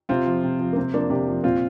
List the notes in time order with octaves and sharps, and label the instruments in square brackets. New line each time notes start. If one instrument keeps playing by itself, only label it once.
[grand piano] C3 C4 F4
F3
C3
F3
A#3
C3 C4
F3 A#3 D4
C3 D4 G4
F3
A#2 C4 F4